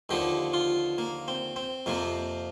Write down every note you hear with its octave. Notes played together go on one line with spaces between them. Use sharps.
D#2 D3 F3 G4
F4
A#3
C4
C4
F2 C3 F3 A#3